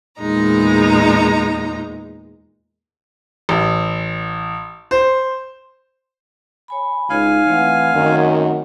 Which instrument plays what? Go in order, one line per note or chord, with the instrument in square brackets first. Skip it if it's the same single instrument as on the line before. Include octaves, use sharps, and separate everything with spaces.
[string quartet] E2 A#2 G#3 D#4 A#5
[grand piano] A1
C5
[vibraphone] C#5 G#5 B5
[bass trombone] C#2 [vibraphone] D#4 C#5 [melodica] F5 G#5
[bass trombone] E3 [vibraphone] A3 C4 F#5
[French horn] F#2 [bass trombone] D#3